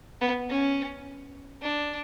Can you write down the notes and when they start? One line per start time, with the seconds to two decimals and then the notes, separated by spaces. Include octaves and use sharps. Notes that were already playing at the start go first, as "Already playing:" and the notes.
0.21 B3
0.50 C#4
1.62 D4